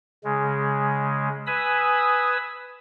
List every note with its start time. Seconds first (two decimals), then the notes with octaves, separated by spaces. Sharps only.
0.25 C#3 G#3
1.47 B4 G#5 B5 D#6 E6